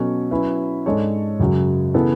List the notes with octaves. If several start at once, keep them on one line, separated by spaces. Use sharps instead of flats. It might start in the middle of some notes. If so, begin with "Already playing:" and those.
Already playing: B2 F#3 C#4 F#4 A4
F#3 C#4 E4 B4 E5
G#2 G#3 D4 A4 C#5
F#2 C#3 F#3
C#3 E3 B3 E4 A4